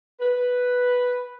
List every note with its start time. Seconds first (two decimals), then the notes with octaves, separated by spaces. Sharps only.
0.20 B4